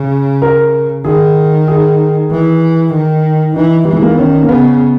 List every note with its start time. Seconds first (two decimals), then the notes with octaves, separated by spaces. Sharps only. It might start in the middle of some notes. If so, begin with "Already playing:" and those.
Already playing: C#3
0.42 A#4
1.05 D#3 G#4
1.68 G#4
2.31 E3
2.93 D#3
3.56 E3 D#4
3.85 E3 G3
3.93 G#3
4.02 A#3
4.10 B3
4.18 D#3 C#4
4.43 A#3
4.49 C#3 B3